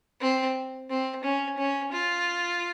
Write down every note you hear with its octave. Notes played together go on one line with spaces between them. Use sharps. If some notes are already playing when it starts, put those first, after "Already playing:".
C4
C4
C#4
C#4
F4